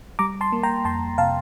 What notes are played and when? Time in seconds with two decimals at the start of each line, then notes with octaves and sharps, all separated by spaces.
0.19 G3 A#5 D6
0.41 A5 C6
0.52 A#3
0.63 G5 A#5
0.85 F2 A5 C6
1.18 C3 F5 A5